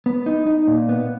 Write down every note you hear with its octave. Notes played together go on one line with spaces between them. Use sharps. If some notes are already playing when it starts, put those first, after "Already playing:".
B3
D#4
D#4
A#2
B3